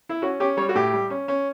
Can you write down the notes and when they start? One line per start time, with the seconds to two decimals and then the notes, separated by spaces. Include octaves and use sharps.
0.09 E4
0.22 C#4 F#4
0.40 C#4 G4
0.57 G3 C#5
0.69 F#4
0.75 A2 G4
0.93 G3
1.10 C#4
1.28 C#4